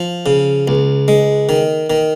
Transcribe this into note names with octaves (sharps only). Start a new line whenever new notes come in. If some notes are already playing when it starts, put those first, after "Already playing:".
Already playing: F3
C#3
C#2
G#3
D#3
D#3